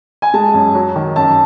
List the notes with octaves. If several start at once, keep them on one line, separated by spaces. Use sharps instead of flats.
G#5
G#3 A5
F#2
F#3
D#3
F#2 A5